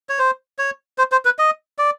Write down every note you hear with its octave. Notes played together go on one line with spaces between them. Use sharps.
C#5
C5
C#5
C5
C5
B4
D#5
D5